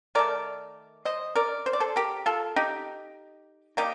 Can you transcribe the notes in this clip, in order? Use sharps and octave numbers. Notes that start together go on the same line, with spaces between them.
D#3 A3 A#4 D5
C5 D#5
A#4 D5
C5
D5
A4 C5
G4 A#4
F4 A4
D#4 G4
G3 A#3 D#4 G4